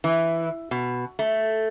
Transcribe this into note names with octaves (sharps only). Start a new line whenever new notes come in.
E3
B2
A3